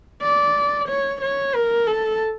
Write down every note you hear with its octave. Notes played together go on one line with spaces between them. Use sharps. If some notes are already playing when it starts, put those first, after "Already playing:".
D5
C#5
C#5
A#4
A4